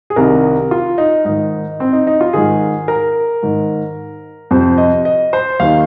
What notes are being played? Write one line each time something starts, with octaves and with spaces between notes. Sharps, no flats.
G#4
C2 C3 D#3 A#4
F4
D#4
G#2 D#3 D#4
C4
D#4
D#4
F4
G#2 D#3 G#4
A#4
G#2 D#3
F2 C3 F3 C5
D#5
D#5
C5
D#2 D#3 F5